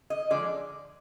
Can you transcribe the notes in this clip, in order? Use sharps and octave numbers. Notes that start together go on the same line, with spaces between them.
D#5
D3 F3 G#3 D5